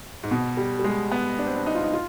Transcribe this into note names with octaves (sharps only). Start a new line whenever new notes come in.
G#2
B2
G3
G3
G#3
B3
D4
C4
D4
D#4
F4
D#4
F4